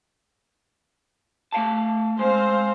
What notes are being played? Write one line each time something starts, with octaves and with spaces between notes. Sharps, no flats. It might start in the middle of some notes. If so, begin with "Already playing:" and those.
A3 F5 A5
G#3 C4 C5 F5